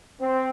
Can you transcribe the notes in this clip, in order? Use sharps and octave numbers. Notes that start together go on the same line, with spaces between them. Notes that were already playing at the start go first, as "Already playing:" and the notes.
C4